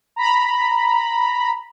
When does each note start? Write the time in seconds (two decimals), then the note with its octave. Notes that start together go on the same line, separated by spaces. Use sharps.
0.16 A#5 B5